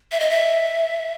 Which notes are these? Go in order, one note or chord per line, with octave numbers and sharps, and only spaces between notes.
E5
D#5
E5